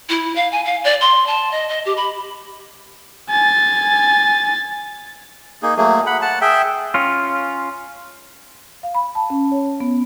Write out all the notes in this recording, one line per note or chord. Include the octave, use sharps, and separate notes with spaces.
E4
F5
G#5
F5
D5
C6
A5
D#5
D#5
G4
B5
G#5 A6
A#3 D#4 G#4
F#3 A3 A#3 G#4
F#5 B5
F#5 A5
G#4 E5 G5
C#4 F4
F5
B5
A5
C#4
C#5
B3